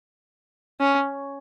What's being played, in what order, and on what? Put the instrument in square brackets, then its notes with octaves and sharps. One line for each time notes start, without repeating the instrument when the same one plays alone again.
[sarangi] C#4